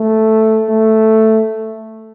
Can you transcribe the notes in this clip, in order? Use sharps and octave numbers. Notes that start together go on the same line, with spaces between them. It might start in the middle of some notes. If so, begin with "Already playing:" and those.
Already playing: A3
A3